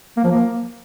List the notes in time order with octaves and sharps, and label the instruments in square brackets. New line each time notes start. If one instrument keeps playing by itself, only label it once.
[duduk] A#3
F3
A#3